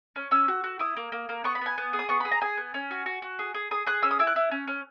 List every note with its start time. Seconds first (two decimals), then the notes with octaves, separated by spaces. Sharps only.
0.16 C#4
0.31 C#4 E6
0.48 F#4
0.64 F#4
0.79 E4 D#6
0.96 A#3
1.12 A#3
1.29 A#3
1.44 B3 C#6
1.55 B5
1.61 B3 G#5
1.78 B3
1.93 G#4
1.99 D#6
2.09 B3 C#6
2.20 G#4 B5
2.32 A#5
2.41 G#4 G#5
2.57 B3
2.74 C#4
2.91 F#4
3.06 F#4
3.22 F#4
3.39 G#4
3.54 G#4
3.71 G#4 D#6
3.86 G#4 F#6
4.03 C#4 E6
4.11 D#6
4.19 E4 E6
4.27 F#6
4.36 E4
4.51 C#4
4.67 C#4